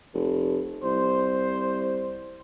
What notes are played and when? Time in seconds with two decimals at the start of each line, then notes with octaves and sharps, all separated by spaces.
0.14 F1
0.83 C2 C5